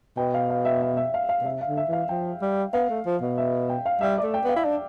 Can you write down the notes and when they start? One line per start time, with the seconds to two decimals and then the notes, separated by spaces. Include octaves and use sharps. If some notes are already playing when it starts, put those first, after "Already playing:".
0.17 B2 G5
0.34 F5
0.50 F5
0.65 E5
0.82 E5
0.97 E5
1.14 F5
1.29 F5
1.41 B2
1.45 C3 E5
1.61 F5
1.67 D3
1.77 E5
1.88 E3 F5
2.09 F3 G5
2.42 G3
2.73 B3 F5
2.89 A3
3.05 F3
3.22 B2
3.38 E5
3.69 G5
3.86 F5
4.01 G3 E5
4.18 A3 D5
4.34 G5
4.44 B3 F5
4.56 E4
4.65 D4